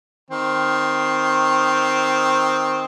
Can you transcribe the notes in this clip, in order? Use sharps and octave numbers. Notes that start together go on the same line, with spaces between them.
D#3 C4